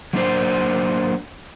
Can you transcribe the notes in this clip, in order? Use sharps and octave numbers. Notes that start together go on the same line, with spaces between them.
F#3 A#3 D4 C5